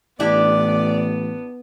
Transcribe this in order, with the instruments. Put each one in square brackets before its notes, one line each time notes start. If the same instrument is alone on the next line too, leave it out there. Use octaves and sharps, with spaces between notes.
[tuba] A1 [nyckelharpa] B3 [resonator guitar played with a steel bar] D4 E4 G4 [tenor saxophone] D5